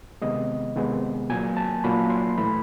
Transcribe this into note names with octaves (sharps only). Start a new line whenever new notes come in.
C3 D#3 G#3 B3 D#5
C3 D#3 G#3 B3
A#2 F#3 A#3 G#5
A5
A#2 F#3 A#3 B5
C6
A2 E3 A3 B5